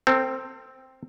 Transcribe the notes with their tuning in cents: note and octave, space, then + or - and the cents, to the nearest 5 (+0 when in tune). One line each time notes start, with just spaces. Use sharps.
C4 +0 A4 +40